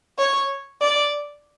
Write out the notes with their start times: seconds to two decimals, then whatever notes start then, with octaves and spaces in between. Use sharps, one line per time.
0.18 C#5
0.80 D5